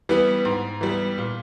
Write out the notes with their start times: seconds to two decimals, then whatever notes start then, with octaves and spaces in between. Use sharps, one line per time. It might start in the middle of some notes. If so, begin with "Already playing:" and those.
0.09 E3 G3 B3
0.45 G#2
0.81 E3 G3 B3
1.18 A#2